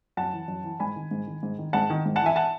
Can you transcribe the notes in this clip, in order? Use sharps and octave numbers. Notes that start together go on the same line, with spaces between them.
F#2 F#5 A5
E3
F#2
E3
G#2 G#5 B5
D#3
G#2
D#3
G#2
D#3
G#2 F#5 A5
D#3
G#2
F#5 A5
E3 E5 G#5
F#5 A5